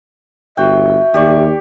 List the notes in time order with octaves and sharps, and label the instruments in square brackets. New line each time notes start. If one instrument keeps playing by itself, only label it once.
[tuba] G1 [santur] F#4 G5 [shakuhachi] E5
[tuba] D#2 [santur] G4 D5 C#6